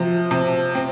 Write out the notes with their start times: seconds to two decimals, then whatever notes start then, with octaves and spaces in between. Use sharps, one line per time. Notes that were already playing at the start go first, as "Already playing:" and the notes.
Already playing: C3 F3
0.31 C3
0.75 C4